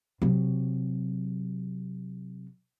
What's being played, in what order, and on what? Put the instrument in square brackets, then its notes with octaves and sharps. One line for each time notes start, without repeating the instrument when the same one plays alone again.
[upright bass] C3 F#3